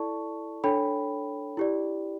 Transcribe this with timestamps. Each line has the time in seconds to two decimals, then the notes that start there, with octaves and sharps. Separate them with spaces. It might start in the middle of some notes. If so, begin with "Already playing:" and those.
Already playing: E4 A4 D5 A5 C#6
0.64 D4 A4 C#5 G5 B5
1.57 E4 G4 D5